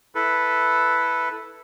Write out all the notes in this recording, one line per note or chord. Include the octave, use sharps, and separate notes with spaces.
E4 A4 B4